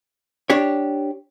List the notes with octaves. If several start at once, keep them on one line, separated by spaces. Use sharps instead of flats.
D4 G4 C#5